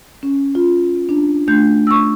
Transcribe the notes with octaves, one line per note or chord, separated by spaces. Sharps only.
C#4
F4
D4
A3 D4 G6
C#6 E6